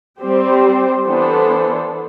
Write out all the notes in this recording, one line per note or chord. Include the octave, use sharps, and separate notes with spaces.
G3 C4 G4 C5
E3 B3 D4 A4 C5